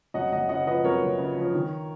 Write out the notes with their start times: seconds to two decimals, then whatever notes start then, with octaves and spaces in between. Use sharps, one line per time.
0.14 F#2 D#5 F#5
0.32 F#1 D#5 F#5
0.49 C#3 D#5 F#5
0.67 F3 B4 D#5
0.84 F#2 A#4 C#5
1.02 F#1
1.19 C#3
1.37 F3
1.54 D#3